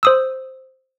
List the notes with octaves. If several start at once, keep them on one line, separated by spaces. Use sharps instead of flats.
C5 D#6 E6